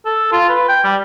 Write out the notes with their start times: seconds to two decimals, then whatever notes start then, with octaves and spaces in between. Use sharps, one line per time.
0.05 A4
0.32 F4
0.49 B4
0.69 G5
0.84 G3